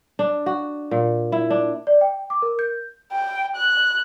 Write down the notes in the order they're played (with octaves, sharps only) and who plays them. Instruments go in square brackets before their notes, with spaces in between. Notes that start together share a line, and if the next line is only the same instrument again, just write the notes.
[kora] D4
F#4
A#2
E4
D4
[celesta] D5
G5
D6
A#4
G6
[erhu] G5
F#6